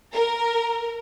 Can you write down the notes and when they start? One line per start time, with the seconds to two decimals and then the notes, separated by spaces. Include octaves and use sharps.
0.13 A#4